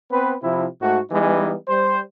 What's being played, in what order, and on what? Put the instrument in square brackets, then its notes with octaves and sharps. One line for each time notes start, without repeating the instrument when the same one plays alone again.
[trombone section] B3 C4 B4
C3 F3 E4
G#2 A3 F#4
E3 G3 G#3 B3 D#4
G3 C5